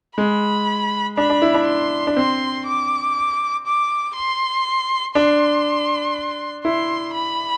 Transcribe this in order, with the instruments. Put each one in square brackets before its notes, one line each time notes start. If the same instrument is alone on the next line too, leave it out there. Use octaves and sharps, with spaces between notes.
[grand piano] G#3 [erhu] B5
[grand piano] D4 [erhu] B5
[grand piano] D4
E4
D4
[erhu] C6
[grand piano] D4
[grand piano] C4 [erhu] C6
[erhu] D6
D6
C6
[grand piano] D4 [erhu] C6
[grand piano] E4 [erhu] C6
[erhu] B5